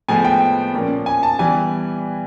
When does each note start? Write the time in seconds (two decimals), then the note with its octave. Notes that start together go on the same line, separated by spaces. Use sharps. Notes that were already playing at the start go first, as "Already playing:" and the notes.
0.08 A2 F3 G#3 B3 G#5
0.25 G5
0.74 A#2 F3 A#3 C#4
1.06 G#5
1.23 A5
1.39 E3 G3 B3 G#5